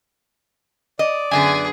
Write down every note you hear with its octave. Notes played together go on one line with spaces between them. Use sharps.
D5 D#5
F#2 D3 B3 G#4 G#5